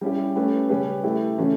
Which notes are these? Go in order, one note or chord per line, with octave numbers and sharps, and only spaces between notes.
G3 C#4 E4 G4
A3 C#4 G4 B4
C#3 G3 C#4 G4 B4
A3 E4 G4
C#3 E3 A3 C#4 F#4